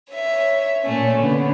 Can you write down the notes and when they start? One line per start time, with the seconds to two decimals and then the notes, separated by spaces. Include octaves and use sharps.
0.11 C#5 E5
0.83 A#2 A3 C#4
1.18 D3 B3